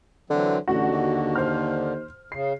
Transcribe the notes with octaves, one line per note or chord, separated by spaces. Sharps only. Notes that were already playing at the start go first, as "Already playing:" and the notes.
D3 E3 F#3 C4
A1 D3 F#4
D#2
C5 F6
C#3 C7